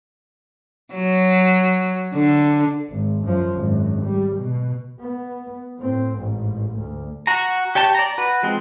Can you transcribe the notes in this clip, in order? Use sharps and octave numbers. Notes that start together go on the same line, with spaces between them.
F#3
D3
G#1
F#2 F3
G#1 F#2
G3
B2
B3
A2 C4
A1 G#2
D2
F#4 A#5
G4 C#5 G5 A5
D5 A#5
F#4 B4
F3 G#3 C4